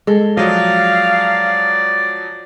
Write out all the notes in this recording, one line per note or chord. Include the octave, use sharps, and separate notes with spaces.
G#3 A4
F3 F#3 D5 D#5 F5